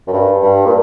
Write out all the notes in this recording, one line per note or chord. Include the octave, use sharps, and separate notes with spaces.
F#2
G2
G2
A#2